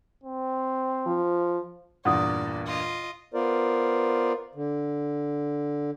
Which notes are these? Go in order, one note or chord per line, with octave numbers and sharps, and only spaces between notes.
C4
F3
E2 G2 A#2 D5 F#5 D#6
F4 D#5
B3 F4 A#4 C5 D5
D3